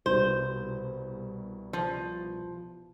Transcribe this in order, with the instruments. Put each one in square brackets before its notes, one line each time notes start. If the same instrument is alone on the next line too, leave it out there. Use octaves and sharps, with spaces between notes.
[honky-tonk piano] C2 B2 G3 [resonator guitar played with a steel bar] C5
[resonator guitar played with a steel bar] F3